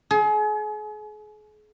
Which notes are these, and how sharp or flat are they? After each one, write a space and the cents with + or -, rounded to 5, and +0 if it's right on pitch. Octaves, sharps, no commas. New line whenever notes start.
G#4 +35